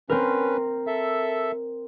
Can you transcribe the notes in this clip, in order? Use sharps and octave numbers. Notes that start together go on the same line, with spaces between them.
C4 C#4 A#4 B4
A4 E5